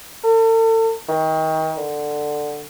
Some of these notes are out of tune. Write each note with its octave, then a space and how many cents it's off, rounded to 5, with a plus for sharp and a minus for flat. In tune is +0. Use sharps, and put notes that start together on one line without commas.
A4 +40
D#3 +30
D3 +10